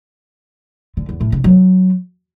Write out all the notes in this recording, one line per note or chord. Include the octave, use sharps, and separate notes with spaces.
D3
E2
A2
C#3
F#3